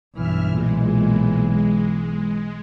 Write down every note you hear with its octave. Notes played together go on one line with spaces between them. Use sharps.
B1 G2 E3 E5 F6
A#2 G#3
G#3